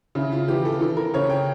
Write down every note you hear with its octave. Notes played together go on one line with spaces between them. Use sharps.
C#3 E4
F4
E3 G4
A4
E3 A4
A#4
C#3 C#5
G5